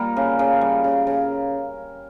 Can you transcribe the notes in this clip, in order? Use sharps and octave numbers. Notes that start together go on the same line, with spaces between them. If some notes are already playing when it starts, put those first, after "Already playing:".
Already playing: G3 A#3 A#4
C#3
C#3
G3
C#3
C#3